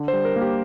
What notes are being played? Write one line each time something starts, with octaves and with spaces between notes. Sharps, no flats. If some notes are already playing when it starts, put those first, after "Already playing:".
Already playing: D3
C5
G3
A#4
A#3
G4